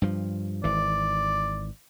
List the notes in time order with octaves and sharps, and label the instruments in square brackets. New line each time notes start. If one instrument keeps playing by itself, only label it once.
[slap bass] G2 F3
[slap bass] G#1 E3 [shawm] D5